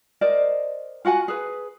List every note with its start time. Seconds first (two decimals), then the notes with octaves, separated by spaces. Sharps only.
0.21 A#4 C5 D5 D#5
1.05 F4 F#4 F#5 G#5
1.28 G#4 B4